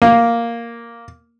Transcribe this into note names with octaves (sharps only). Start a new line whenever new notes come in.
A#3